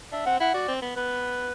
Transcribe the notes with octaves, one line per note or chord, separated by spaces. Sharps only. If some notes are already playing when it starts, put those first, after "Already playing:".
D4 E5
C4 F#5
E4 F#5
F#4 D5
C4
B3
B3 B4